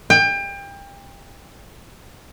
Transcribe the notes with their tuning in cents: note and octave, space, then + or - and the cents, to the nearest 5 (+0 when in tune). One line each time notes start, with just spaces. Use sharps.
G5 +30